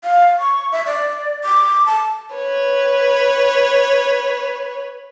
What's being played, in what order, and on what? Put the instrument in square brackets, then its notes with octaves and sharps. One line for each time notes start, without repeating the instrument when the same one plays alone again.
[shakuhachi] F5
C#6
E5
D5
D6
A5
[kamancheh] B4 C#5